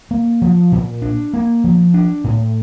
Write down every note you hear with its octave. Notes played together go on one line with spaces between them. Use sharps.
A#3
F3
A#2
D4
A#3
F3
D4
A2